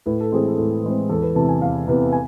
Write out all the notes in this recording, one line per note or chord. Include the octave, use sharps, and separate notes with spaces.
A2 B4
A4
E3 G#3 C4 G#4
A4
A2
E3 G#3 C4
E2 A4
B4
C3 E3 B3 A5
G#5
E2 F5
C3 E3 B3
G#5